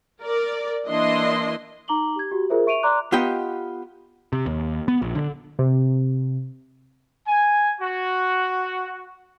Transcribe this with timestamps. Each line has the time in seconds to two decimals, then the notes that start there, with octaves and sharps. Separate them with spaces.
0.22 A#4 D5
0.88 E3 A#3 D4 E4 D#5 C6
1.88 D#4 A#5 D6 F#7 G7
2.16 G4 G#6
2.31 F#4 G4
2.49 F4 G#4 A#4 C5 E5
2.66 E5 C#6 D7 D#7 F7
2.83 D5 A#5 C6 D6 F#6
3.12 B3 F4 G4 D#5 G5
4.33 C3
4.46 D#2
4.88 B3
5.02 A#1
5.15 D3
5.59 C3
7.27 G#5
7.80 F#4